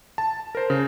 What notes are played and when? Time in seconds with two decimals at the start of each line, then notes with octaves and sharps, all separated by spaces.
0.18 A5
0.55 A#4 C5
0.70 C#3